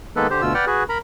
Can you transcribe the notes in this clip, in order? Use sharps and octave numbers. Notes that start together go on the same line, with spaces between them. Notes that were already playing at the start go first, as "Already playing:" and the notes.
D#3 G#3 A#3 B3 A4 B4
D3 G4 C5
D2 B2 F4 E6
B4 D5 F#5 G5 F6
F#4 G#4 B4
A#4 A#5 B5